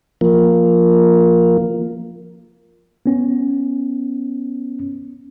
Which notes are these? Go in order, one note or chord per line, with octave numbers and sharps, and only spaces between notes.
F3 A#3
B3 C#4